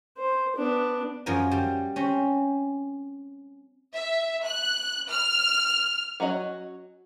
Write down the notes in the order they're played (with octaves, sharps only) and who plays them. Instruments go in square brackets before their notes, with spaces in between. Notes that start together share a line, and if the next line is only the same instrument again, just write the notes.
[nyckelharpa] C5
B3 D4
[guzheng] F#2 F3 A#4 G#5
G3
C4 C#4
[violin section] E5
F#6
F6
[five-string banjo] F#3 C#4 F#4 D#5